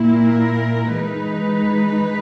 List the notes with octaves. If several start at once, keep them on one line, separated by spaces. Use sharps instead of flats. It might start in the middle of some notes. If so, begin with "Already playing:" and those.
Already playing: A#2 A#3 E4
A#4
E3 G#3 D#4 B4